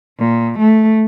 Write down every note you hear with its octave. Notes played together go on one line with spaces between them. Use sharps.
A#2
A3